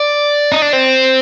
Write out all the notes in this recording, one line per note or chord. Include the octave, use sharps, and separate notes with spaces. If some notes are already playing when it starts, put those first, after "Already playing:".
Already playing: D5
D#4
D4
C4